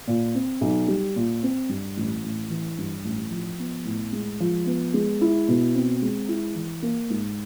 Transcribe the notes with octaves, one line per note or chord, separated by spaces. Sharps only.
A#2
C4
B1
G3
A#2
C4
G2
A1
A1
E3
G2
A1
F3
B3
A2
G#3
F3
B3
G#3
E4
B2
C4
G#3
E4
E3
A#3
G#2